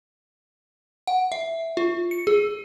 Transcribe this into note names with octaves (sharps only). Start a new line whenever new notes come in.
F#5
E5
F4
C#7
G#4